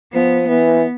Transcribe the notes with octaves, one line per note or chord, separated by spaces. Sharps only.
F3 B3
E3 B3